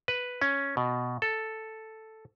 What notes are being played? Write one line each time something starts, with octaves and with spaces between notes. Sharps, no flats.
B4
C#4
B2
A4